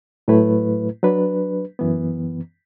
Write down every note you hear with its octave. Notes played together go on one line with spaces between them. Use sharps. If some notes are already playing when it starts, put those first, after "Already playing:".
A2 F#3 A3 E4 B4
F#3 D4 B4
F#2 E3 B3